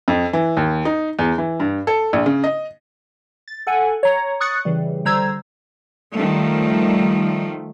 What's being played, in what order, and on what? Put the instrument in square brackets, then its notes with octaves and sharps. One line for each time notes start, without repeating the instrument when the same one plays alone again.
[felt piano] F2
E3
D#2
D#4
E2
E3
G2
A4
A#1
C#3
D#5
[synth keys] A6
A4 F#5 G#5
C#5 A#5
C#6 D#6 F#6 A6 C#7
C#3 E3 G3
D3 G3 C5 A#5 E6 G#6
[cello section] D#3 F3 G3 A3